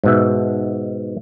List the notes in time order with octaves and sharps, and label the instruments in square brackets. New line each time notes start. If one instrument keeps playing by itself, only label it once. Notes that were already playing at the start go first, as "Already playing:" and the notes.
[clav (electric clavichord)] G#2 B2 E5